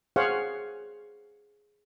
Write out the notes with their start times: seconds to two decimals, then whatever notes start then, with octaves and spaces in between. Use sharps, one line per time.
0.16 G#4 C5 C#5 F5 F#5